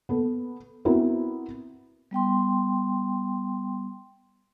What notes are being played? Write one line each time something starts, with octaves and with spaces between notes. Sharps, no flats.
B3 A4
B3 C4 E4 F#4 A#4
G3 B3 G5 C6